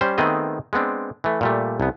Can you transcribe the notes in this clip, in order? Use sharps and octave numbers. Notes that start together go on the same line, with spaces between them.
G3 C#4 C5
D#3 A3 B3 C4 G#4 D#5
G#3 B3 C4 D4
E3 A3
A#2 G3 A3
C2 B3